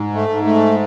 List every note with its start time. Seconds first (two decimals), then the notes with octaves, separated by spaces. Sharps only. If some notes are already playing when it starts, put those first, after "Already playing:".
Already playing: G#2
0.14 A3
0.29 G#2
0.44 A3